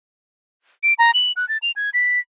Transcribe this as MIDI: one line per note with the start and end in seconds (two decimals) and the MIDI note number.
0.83 0.94 98
0.99 1.11 82
1.14 1.32 102
1.36 1.48 90
1.49 1.58 93
1.62 1.72 101
1.76 1.90 92
1.94 2.19 95